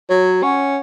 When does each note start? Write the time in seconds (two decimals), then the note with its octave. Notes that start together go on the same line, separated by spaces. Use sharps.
0.09 F#3 C#5
0.43 C#4 F#5 C#6